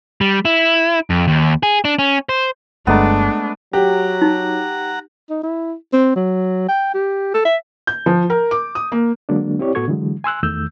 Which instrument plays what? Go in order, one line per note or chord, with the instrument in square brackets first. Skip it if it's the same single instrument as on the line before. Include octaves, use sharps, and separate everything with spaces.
[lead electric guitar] G3
E4
F2
D#2
G#4
D4
C#4
C5
[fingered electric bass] G1 G2 [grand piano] G#3 A3 A#5 [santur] B3 [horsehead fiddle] D4
[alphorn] F#3 [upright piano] G4 [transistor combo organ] F#5 A#5
[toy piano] D#4
[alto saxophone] D#4
E4
C4
F#3
G5
G4
A4
E5
[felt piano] G6
F3
A#4
D6
D#6
A#3
[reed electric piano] D3 F#3 G#3 A#3 D4
C4 E4 G4 C#5 D5
A2 B3 F#4 A4 C#6 G#6
D3 E3 F#3 G#3
G#5 C6 E6 F#6
E2 D#3 A3 E6 G6